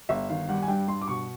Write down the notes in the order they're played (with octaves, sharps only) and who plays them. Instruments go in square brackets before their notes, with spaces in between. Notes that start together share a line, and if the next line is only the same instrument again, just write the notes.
[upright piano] G1 E5
D#3 F5
G3 F#5
G#5
G2 G5
G2 C6
D6
B2 C#6